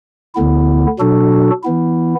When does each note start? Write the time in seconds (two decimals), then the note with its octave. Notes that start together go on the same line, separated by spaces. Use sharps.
0.35 D2 D3 B3 E4
0.99 B2 F#3 D4 F#4 A4
1.63 E3 B3 E4